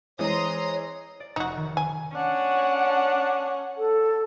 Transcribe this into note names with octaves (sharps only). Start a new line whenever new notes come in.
E3 G#3 C4 C#5 A#5 C6 D#6
D5
F1 D#4 F#4
D#3
G#5
C#4 D4 F#5
A4